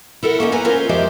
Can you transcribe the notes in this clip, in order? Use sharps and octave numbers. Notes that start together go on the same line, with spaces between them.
E4 A4 A#4 F#5
A#3 C#4 D#4
B4 F#5 G#5 A#5
C#4 F4 A#4 C5
F2 G#3 G4 C5 E5 F5